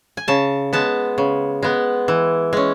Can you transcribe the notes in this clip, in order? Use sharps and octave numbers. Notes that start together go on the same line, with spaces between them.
G#5
C#3 A5
G#3 B3 A5
C#3
G#3 B3
E3
G#3 C#4